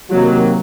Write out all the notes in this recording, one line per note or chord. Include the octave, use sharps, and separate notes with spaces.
C3 D#3 F#3 A#3